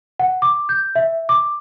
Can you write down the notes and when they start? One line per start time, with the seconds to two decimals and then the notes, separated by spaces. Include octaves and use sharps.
0.19 F#5
0.42 D6
0.69 G6
0.95 E5
1.29 D6